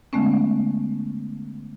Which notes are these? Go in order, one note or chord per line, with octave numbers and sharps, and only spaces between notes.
D3 G#3 A3 B3 C#4